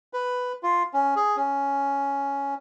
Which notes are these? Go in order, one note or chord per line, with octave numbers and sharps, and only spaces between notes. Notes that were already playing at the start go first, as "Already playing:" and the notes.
B4
F4
C#4
G#4
C#4